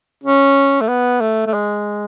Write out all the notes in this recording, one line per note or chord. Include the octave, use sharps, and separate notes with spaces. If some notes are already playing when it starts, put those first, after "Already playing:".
C#4
A3
B3
A3
A3
G#3